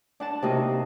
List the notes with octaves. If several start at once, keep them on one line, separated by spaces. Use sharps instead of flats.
D4 F#5 A5
C3 A#3 D#4 F#4